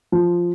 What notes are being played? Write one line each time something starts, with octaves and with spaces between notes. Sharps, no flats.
F3